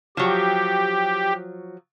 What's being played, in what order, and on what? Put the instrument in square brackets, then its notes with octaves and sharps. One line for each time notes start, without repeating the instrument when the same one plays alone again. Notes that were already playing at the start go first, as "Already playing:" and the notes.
[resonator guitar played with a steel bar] F3 F#3 [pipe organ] G4